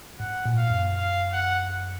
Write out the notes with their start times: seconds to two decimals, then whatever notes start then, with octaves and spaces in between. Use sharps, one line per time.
0.20 G#2 F#5
0.46 A#2
0.57 F5
0.70 F#2
0.96 F5
1.33 F#5